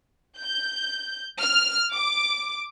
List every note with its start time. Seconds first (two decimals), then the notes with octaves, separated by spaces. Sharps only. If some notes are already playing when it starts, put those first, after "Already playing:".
0.39 G6
1.42 F6
1.93 D6